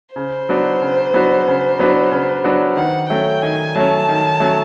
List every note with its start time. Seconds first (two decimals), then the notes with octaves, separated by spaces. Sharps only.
0.16 C#3 C5
0.49 F#3 B3 D4 F#4
0.82 C#3
1.14 F#3 B3 D4 F#4
1.47 C#3
1.79 F#3 B3 D4 F#4
2.11 C#3
2.44 F#3 B3 D4 F#4
2.77 D#3 F#5
3.10 F#3 A3 C#4 G5
3.43 D#3 G#5
3.75 F#3 A3 C#4 A5
4.08 D#3
4.40 F#3 A3 C#4